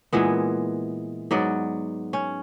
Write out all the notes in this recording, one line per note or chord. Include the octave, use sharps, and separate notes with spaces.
A#2 E3 G#3 B3
G#2 F#3 B3 D5
C#4